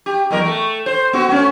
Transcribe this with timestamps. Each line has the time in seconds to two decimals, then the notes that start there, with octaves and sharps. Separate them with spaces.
0.06 G4
0.30 E2 F#3 A#4
0.45 A3
0.86 C5
1.13 B3 F#4
1.29 A3 C#4